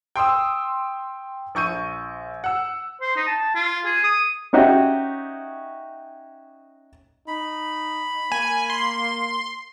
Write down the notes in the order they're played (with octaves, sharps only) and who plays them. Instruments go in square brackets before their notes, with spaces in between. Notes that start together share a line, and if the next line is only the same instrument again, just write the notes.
[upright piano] G5 C6 D#6 E6
A#1 C#6 G6 D#7
F#5 E6
[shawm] C5
D#4
A5
F4
G#4
D#6
[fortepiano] C#4 D#4 F#4 G4 D#5 E5
[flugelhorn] D#4 [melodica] B5
[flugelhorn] A#3 [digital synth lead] G#5
[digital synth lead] C6